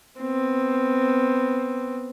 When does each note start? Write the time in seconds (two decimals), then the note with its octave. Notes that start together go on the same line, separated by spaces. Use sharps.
0.20 B3 C4